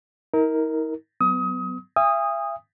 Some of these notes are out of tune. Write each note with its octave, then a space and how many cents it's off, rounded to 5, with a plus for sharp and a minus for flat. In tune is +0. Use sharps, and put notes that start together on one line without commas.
D#4 +45 A#4 +0
F#3 +15 B3 +30 D#6 +30
E5 +40 G#5 -45 D#6 +0